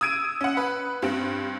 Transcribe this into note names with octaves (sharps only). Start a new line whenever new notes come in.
D#6 E6 G#6 D7 D#7
C#4 F#5
B4
G2 C4